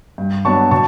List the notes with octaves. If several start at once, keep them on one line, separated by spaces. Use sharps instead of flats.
G2
F#3 B3 D4 A5 C#6
B2 A5 C#6